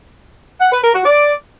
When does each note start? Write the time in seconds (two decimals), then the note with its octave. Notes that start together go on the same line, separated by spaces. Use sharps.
0.61 F#5
0.72 B4
0.83 A#4
0.94 F#4
1.05 D5